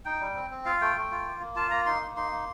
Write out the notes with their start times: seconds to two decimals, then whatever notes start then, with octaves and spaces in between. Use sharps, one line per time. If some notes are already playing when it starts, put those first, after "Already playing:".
0.05 D#4 G5
0.20 G3
0.35 C4
0.50 C4
0.65 F4 F5
0.81 A3 G5
0.96 A3
1.11 F4
1.26 A#3
1.41 A#3
1.56 F4 A5
1.71 A#3 A#5
1.86 D#4 C6
2.02 A#3
2.16 D#4 C6
2.32 A#3